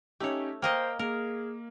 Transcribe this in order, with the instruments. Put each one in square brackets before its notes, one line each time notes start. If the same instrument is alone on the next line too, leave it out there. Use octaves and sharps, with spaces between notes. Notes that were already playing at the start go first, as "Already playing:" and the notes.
[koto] A3 C#5 [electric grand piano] C#4 D#4 G4
[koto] A#3 A#4 D#5 [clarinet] C5 [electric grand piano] G5 F6
[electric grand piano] A#3 [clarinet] G#4 [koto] A#4